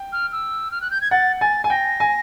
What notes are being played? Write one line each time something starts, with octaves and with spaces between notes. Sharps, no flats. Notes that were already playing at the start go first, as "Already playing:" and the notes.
Already playing: G5
F6
E6
F6
F#6
G6
G#6
F#5 A6
G#5 A6
G#5
G5 A#6
G#5